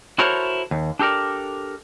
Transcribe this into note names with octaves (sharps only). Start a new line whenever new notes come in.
E4 F#4 A4 A#4 C5 C#5
D#2
D4 G4 A4 A#4 D5